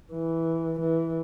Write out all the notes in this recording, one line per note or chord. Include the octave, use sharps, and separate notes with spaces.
E3
E3